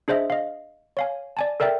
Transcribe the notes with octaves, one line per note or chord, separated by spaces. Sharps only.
D4 G#4 C5 D#5 E5
D#5 F5
C#5 F5 G#5
D5 G#5 A5
A4 A#4 D5 E5 G5